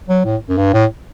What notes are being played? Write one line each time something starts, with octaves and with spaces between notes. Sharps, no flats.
F#3
A2
F#2
G2
A2